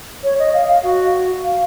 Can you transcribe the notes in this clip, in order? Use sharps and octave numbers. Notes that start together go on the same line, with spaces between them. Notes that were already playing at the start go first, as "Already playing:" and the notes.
C#5
D#5
F5
F5
F#4
F5